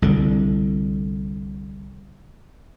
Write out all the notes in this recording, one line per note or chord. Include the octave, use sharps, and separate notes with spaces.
C2 D3